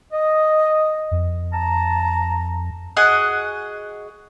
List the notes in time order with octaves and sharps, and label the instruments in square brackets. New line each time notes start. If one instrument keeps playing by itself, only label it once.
[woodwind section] D#5
[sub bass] F2
[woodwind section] A5 A#5
[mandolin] F#4 G#4 D#5 F#5